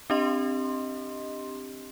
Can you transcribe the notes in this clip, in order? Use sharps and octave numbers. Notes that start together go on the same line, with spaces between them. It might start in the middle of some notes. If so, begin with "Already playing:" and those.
C4 D4 G4 D#5 C6